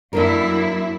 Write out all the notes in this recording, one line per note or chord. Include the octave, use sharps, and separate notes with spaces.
F#2 A#3 D4 E4 A#4